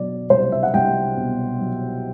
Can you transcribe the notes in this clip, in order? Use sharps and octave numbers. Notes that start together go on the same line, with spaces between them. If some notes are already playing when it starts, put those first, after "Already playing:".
Already playing: B2 F#3 D5
C2 C5
E5
F#5
C2 G5
B2
F#3